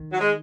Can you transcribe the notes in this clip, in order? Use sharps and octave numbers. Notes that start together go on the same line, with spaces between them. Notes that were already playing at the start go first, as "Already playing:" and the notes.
Already playing: D#3
F#3
G#3